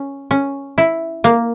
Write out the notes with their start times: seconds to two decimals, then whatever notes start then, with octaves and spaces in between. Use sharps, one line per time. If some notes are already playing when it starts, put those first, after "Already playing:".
Already playing: C#4
0.31 C#4
0.78 E4
1.24 A#3